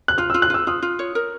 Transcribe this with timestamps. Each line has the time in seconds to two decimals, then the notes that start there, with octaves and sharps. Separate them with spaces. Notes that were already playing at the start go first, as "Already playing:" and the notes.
0.08 F#6
0.18 F4 F6
0.30 F4 E6
0.42 F#6
0.50 F4 E6
0.67 F4 D#6
0.83 F4
0.99 C#5
1.15 A#4